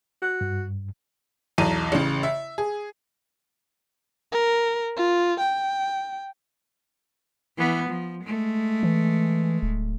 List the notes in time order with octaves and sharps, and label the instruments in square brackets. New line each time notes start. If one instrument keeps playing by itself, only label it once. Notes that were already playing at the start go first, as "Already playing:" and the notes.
[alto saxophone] F#4
[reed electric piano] G2
[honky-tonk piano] B1 E2 A5 A#5 D#7
A1 C#3
E5
G#4
[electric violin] A#4
F4
G5
[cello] E3 B3
F3
G#3 A3
[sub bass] E3
D1